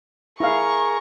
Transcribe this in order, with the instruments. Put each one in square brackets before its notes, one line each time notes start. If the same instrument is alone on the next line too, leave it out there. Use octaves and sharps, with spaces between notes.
[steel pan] E4 F5 [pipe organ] G#4 A#4 A#5 [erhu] C#6